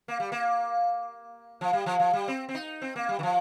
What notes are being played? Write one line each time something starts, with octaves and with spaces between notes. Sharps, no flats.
A#3
G3
A#3
F3
G3
F3
F3
G3
C4
C4
D#4
C4
A#3
G3
D#3
F3